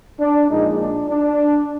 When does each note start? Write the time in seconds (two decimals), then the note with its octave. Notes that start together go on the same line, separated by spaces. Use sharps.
0.20 D4
0.50 A#1 A#2 G#3 D#4
0.80 D4
1.09 D4